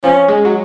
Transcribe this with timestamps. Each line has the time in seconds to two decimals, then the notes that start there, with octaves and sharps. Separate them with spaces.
0.04 F3 C#4
0.28 G#3
0.45 F#3